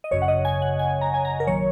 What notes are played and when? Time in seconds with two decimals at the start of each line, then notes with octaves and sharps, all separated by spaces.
0.04 D#5
0.11 G#1 F#2 C#3 C#5
0.22 F#5
0.28 D#5
0.45 G#5
0.62 F#5
0.79 G#5
1.01 A#5
1.14 G#5
1.25 A#5
1.40 A#4
1.47 A#1 D#3 F#3 C#5